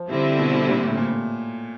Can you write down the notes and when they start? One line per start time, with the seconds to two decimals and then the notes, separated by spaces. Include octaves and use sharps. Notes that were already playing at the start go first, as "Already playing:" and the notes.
Already playing: F3
0.09 D3 G3 C4 E4
0.39 B2
0.53 B2
0.68 A#2
0.83 A2
0.97 A#2